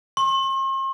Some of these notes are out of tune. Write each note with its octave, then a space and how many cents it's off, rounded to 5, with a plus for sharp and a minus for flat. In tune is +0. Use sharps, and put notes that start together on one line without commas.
C6 +45